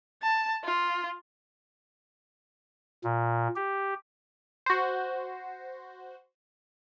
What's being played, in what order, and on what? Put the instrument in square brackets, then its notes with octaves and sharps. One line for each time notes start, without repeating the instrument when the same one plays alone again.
[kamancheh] A5
F4
[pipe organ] A#2
G4
[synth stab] F#4 C5